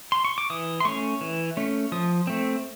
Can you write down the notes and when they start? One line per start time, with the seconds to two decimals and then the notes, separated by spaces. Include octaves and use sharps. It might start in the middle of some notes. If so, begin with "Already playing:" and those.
0.12 C6
0.25 C#6
0.38 D6
0.50 E3 D#6
0.80 C6
0.85 A3 C#4 C#6
1.21 E3
1.57 A3 C#4
1.92 F3 D#6
2.27 A3 C4